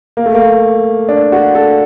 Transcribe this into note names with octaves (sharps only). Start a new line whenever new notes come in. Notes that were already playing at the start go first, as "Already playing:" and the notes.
A#3
A3
A#3
D4
F#4
A4